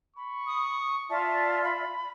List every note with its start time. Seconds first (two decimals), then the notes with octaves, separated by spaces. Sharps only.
0.16 B5 C#6
0.46 D#6
1.10 F4 D5 E5 A5
1.63 B5